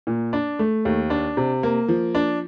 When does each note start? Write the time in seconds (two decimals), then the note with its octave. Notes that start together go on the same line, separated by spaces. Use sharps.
0.07 A#2
0.33 D4
0.59 A3
0.85 D#2
1.10 D4
1.37 C3
1.63 A#3
1.89 F3
2.15 D4